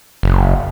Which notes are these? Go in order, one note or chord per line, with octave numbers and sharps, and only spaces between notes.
F#1